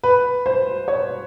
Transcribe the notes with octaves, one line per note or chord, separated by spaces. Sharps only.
B4
C5
C#5